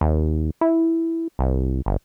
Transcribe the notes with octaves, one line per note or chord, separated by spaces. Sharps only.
D#2
E4
C2
G1